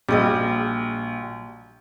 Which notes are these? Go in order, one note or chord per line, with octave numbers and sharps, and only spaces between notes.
A#1 G3 F#4 G#4 D#5